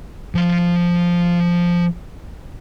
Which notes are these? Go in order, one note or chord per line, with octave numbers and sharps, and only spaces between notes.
F3 C6